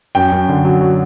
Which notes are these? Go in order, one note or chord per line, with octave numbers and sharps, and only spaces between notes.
F#2 G5
F#2
D3
F#3
F#3